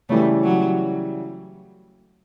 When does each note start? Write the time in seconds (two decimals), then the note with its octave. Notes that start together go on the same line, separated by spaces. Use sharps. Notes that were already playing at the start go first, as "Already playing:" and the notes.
0.09 C#3 E3 G3 A3
0.44 F#3